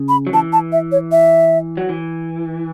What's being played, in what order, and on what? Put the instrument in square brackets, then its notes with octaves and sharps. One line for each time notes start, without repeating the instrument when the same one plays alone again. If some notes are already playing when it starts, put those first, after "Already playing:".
Already playing: [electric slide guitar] C#3
[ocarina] B5
[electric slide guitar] F#3
[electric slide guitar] E3 [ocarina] A5
[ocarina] A5
E5
C#5
E5
[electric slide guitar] F#3
E3